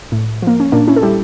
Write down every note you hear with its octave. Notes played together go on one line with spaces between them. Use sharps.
A2
F3 A#3
C#4
A#2 A#3 D4
C#4 E4
A4
G3 E4 G4